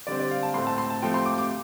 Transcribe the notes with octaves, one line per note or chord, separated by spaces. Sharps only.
D3 G3 C4 D5
D5
F5
A5
A2 A3 C4 C6
A5
C6
A5
C3 F3 A3 C4 G5
C6
D6
D6